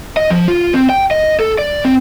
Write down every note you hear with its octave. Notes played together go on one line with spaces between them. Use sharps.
D#5
F3
F4
C4
G5
D#5
A4
D5
C4